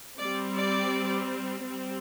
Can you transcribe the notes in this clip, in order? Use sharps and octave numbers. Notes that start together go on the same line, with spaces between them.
G3 C4 D5
D5
G3 C4